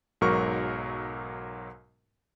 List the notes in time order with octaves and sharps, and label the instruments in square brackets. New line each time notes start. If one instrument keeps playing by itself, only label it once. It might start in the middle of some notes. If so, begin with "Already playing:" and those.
[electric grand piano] B1 G#2 F#3 A#4 C#6